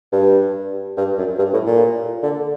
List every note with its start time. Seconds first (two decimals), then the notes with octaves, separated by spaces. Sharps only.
0.13 G2
0.97 G2
1.18 F#2
1.38 G2
1.53 A2
1.66 A#2
2.23 D3